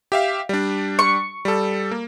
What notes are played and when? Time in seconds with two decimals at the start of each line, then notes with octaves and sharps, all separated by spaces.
0.12 G4 E5 F5
0.49 G3 D4
0.99 C#6
1.45 G3 A4
1.91 A#3